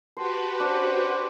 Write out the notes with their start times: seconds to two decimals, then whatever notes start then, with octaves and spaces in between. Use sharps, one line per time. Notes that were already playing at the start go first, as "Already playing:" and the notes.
0.17 F#4 G4 B4 C5 A5
0.60 C#4 D4 C5 F#5